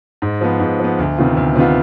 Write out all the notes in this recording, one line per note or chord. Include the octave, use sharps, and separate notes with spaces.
G#2
F3 B3
G#2
F3 B3
D2
C3 D#3 B3 F4
D2
C3 D#3 B3 F4